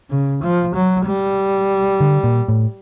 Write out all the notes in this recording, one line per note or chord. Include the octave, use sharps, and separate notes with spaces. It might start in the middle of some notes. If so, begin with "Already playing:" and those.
C#3
F3
F#3
G3
D3
A#2
A2